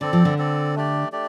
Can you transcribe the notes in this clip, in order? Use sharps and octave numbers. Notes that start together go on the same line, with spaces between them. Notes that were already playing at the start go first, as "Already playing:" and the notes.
D3 C4 A4 D5
F3
D3
C4 A4 D5
A3 D4 G4 D5
A3 D4 G4 D5